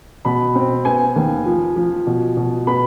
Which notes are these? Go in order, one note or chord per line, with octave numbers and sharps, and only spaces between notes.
B2 B5
C4
B3 G#5
D#2
F3
F3
B2
B2
B3 B5